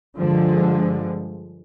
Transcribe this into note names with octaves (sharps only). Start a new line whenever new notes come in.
G2 D3 F3 G#3